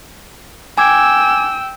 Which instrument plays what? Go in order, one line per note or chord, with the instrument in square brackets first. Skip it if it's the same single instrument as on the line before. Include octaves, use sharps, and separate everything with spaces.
[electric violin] G5 E6 [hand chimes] G#5 D6 G#6